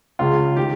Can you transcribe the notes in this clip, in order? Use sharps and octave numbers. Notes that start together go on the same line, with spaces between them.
C#2 C#3 F4
D#3 G4